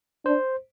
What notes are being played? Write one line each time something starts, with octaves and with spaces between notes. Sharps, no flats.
D4 C5